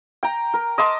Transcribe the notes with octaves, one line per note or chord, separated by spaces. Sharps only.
G5 A#5
A#4
D#5 A5 C6 D6